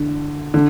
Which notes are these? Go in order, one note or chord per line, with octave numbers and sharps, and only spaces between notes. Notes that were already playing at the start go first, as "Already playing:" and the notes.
Already playing: D3
D3